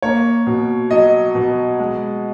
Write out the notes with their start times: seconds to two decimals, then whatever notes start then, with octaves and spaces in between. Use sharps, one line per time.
0.02 A#3 C#5
0.47 B2
0.91 F#3 D#5
1.35 B2
1.79 G#3